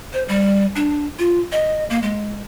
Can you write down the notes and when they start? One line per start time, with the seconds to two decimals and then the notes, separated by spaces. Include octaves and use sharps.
0.13 C5
0.29 G3
0.76 D4
1.19 F4
1.52 D#5
1.90 A#3
2.03 G#3